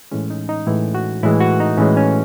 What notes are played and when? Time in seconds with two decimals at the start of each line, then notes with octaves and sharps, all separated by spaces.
0.12 A2 E3 G#3 C#4
0.30 D#4
0.49 D#4
0.67 A2 E3 G#3 E4
0.95 F#4
1.23 A2 E3 G#3 E4
1.41 F#4
1.60 D#4
1.78 A2 E3 G#3 C#4
1.97 C#4